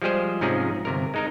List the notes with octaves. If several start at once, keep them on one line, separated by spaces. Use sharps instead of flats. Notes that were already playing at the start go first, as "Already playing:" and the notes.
F3 G3 G#3 G4 G#4 C5
G#2 C3 F3 C#4 D#4 G#4
G1 C3 A#4
G#3 D#4 A#4